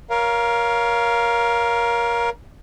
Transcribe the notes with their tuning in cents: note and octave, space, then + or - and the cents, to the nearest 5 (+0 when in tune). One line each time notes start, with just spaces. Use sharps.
A#4 +20 C#5 +20 F5 +0